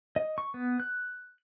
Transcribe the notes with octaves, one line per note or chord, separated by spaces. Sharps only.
D#5
C#6
B3
F#6